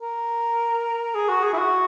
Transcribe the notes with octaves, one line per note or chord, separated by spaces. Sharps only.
A#4
G#4
F#4
G#4
E4
F#4